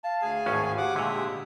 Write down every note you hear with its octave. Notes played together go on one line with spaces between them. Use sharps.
F5 A5
D2 G#4 G#5
G#1 A2 C#4 C#6
G4 F#5 D6
A#2 D3 G#3 E5 D#6